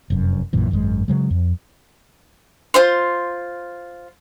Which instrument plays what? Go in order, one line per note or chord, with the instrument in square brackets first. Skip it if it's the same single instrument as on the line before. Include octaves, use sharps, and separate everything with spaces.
[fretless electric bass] F1 F#2
A#1 F#2 A#2 E3
G#1 F#2 C#3 G#3
C#3 F#3 G#3
F2
[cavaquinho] F4 C5 C6